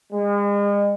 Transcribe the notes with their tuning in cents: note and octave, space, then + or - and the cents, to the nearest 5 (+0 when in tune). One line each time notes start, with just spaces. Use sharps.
G#3 -40